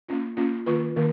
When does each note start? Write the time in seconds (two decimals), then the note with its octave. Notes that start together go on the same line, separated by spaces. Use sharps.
0.09 A#3 C#4 F4
0.37 A#3 C#4 F4
0.66 D#3 A#3 F4 B4
0.96 D#3 A#3